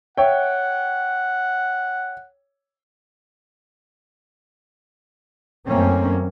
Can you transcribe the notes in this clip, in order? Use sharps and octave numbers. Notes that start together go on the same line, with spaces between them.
C#5 E5 F#5 G5
F#2 D#3 A3 A#3 C4 C#4